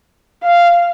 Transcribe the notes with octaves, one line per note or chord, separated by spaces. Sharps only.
F5